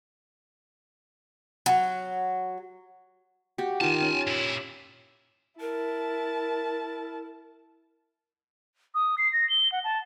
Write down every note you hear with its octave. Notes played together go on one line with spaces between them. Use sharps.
F#3
F#4 G4
D#3 F4 G#5 A5
C#4
A#2 E4
E4 A#4 A5
D#6
C7
A#6
G7
F#5
A5